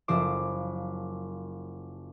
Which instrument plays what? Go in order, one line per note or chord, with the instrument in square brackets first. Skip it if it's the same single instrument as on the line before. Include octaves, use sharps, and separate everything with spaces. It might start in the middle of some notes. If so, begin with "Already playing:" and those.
[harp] F#1 F3 C5 D6